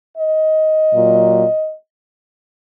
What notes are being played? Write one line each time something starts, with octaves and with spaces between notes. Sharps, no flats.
D#5
A#2 F#3